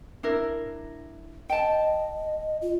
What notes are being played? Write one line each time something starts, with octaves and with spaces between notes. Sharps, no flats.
D4 E4 A#4
D#5 G5 A5
F4